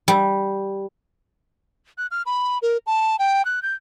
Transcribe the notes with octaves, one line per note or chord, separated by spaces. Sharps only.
G3
F#6
F6
B5
A#4
A5
G5
F#6
G6